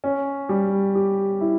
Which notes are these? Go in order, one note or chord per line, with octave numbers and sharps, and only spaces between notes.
C#4
G3
G4
E4